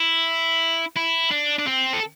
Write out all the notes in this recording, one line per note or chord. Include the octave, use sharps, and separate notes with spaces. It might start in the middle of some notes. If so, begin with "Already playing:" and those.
Already playing: E4
E4
D4
D4
C4
A4